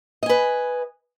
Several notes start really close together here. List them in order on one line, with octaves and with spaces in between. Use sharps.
D#5 G#5 B4